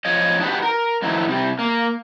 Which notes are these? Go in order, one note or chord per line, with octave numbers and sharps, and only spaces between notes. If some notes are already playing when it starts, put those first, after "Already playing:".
F3 C#5 D#5
D4 D#4 F#4 G4 B4
A#4
A2 D#3 F3 F#3 D#4 E4
C3 G3
A#3